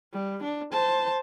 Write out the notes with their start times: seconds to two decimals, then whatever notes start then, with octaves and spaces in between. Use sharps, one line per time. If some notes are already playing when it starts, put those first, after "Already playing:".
0.13 G3
0.43 D4
0.72 C5 A5